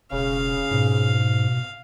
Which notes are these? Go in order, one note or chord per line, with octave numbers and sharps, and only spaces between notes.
E1 C#3 F5
G#2 B2